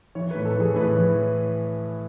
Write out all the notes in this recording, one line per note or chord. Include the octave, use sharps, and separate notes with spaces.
E3 C#5
A2 B4
A4
E3 G#4
A2 B4
E3